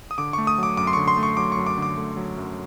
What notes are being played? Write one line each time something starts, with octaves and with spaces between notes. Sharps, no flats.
D#6
D3 D6
A3 C#6
D#6
F#3 D6
F#2 D6
C6
D3 C#6
C6
A3
C#6
F#3 D6
C#6
F#2
D6
D3 D6
A3
F#3
F#2